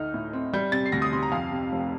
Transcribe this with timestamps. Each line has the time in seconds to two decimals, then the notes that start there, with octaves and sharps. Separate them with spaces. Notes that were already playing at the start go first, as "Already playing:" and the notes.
Already playing: D2 A3 D#4 F6
0.14 A2
0.33 C4
0.53 G3 G6
0.72 C3 A6
0.86 C7
0.92 D2 A#6
1.02 D#6
1.12 C3 C6
1.23 A#5
1.32 F2 F5
1.51 C3
1.72 F1